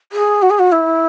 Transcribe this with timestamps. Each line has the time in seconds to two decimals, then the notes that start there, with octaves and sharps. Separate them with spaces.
0.12 G#4
0.42 F#4
0.50 G#4
0.59 F#4
0.72 E4